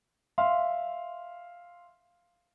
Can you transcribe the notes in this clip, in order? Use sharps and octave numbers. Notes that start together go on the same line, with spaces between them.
E5 F5 C6